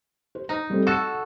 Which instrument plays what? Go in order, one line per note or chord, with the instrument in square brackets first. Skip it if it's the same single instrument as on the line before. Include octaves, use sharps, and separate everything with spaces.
[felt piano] C5
[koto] D#4 [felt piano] A#5
[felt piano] G3 A3 C4
[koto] F#4 A4 [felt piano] E6 C#7